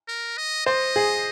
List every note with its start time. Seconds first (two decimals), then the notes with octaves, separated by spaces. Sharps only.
0.08 A#4
0.37 D#5
0.66 C5 D#5
0.96 G#4